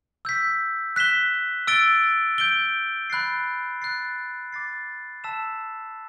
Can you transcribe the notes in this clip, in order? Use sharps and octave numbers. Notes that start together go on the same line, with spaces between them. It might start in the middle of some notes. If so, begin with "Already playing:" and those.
E6 G6 B6
F#6 B6 E7 G7
E6 A6 D7 G7
G6 D7 G7
B5 F#6 A6 C7
F#6 A6 C7
D6 A6 C7
A5 E6 B6 E7